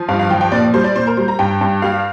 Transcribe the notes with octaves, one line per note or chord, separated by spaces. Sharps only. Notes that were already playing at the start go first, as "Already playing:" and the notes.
Already playing: F3
G2 F5
F5
F3 G5
G5
A#2 D5
G3 C5
D5
A#2 C5
A#4
G3 C5
A#5
G2 G5
G2
G3 F5